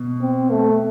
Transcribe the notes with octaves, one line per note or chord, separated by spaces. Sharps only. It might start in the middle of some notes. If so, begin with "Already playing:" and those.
Already playing: B2
C4
A3